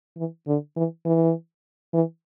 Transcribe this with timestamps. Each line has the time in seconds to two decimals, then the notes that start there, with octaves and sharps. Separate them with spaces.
0.17 E3
0.47 D3
0.76 E3
1.05 E3
1.94 E3